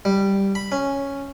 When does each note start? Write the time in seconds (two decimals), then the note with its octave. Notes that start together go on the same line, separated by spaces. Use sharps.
0.05 G3
0.55 B5
0.72 C#4